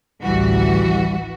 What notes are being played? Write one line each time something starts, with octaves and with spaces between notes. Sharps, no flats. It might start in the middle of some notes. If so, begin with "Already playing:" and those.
A1 D2 E3 G3 F#4